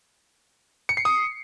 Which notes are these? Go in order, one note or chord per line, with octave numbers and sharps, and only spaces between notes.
C#7
C7
D#6